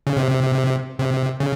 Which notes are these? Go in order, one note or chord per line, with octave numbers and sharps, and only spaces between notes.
C#3
C3
C3
C#3